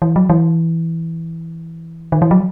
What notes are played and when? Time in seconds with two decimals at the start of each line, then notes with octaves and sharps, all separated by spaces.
0.02 E3
0.16 F#3
0.30 E3
2.12 D#3
2.22 E3
2.31 F#3